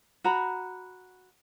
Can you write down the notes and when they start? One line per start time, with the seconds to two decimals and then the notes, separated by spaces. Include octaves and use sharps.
0.24 F#4 A#5 B5